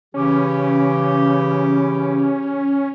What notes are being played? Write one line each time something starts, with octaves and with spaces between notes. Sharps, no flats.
C#3 E3 C#4 G4